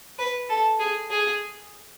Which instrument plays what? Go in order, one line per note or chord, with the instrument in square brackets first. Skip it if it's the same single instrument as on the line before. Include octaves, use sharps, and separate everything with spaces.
[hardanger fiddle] B4
A4
G#4
G#4